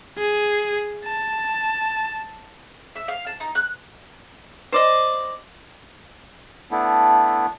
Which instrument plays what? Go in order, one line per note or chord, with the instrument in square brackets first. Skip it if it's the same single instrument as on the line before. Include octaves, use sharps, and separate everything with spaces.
[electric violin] G#4
A5
[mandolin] E5
F5
A5
D#4
F#6
[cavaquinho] C5 D5 D#5
[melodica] A3 B3 D4 E4